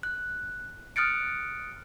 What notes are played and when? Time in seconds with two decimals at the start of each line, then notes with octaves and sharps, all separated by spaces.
0.03 F#6
0.96 D#6 F6 F#6 A6 C#7 D7